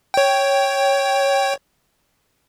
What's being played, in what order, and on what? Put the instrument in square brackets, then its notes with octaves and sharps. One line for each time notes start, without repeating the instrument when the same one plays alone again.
[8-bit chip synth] C#5 G5